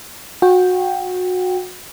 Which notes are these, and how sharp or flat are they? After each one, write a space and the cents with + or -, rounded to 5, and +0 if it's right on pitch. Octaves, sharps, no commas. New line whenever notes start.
F#4 -25 G5 +0